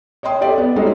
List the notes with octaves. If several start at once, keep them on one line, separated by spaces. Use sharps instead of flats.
C#5 D#5 G5 C6 D#6
G4 A4 D5 D#5 G5
B3
G3 G#3 C4 C#4 D#4 F#4